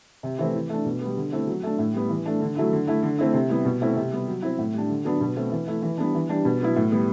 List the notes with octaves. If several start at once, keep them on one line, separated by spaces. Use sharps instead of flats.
C3
E3 A3 C4 E4
E3
A3 D4
B2
G3 B3
D3
A3 C4 E4
F#3
A3 D4
A2
G3 B3
E3
A3 D4
D3
F#3 A3 E4
D3
A3 E4
D3
A3 C4 E4
C3
G3 B3 E4
B2
A3 C4 E4
C3
G3 B3
F#3
C4 E4
A2
G3 D4
D3
F#3 B3 D4
B2
A3 C4
E3
A3 E4
E3
G3 B3 D4
E3
G3 D4
B2
F#3 B3 E4
A2
G3 B3